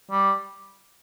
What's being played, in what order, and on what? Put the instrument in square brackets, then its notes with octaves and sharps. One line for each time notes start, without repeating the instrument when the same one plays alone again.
[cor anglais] G3